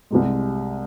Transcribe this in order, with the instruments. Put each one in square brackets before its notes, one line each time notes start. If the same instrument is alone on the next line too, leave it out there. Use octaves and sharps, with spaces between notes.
[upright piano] C2 C3 G#3